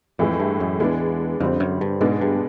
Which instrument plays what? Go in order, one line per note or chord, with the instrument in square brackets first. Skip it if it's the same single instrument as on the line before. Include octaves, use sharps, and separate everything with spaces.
[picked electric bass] F2 [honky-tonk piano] A2 E3 G#3
[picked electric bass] G2
F#2
[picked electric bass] E2 [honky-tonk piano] G#3 B3 D4
[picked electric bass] F2 [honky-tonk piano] D3 G3 C4
[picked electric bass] F#2
G2
[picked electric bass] G#2 [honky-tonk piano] B2 G#3 B3 D4
[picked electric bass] G2